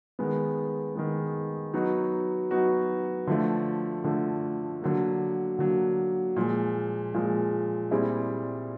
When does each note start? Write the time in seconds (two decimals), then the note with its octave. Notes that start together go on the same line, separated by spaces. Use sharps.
0.19 D#3 G#3 B3
0.95 D#3 G#3 B3
1.74 F#3 B3 D#4 F#4
2.51 F#3 B3 D#4 F#4
3.27 D3 F3 A3
4.04 D3 F3 A3
4.82 D3 F#3 A#3
5.59 D3 F#3 A#3
6.36 A#2 F3 G#3
7.14 A#2 F3 G#3
7.91 A#2 G3 C4 E4 G#4